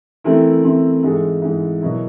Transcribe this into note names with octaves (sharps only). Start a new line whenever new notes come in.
E3 A3 C4 E4 A#4
E3 A3 C4 E4
G#2 E3 G#3 A4
G#2 E3 G#3
B2 F#3 B3 E4 A#4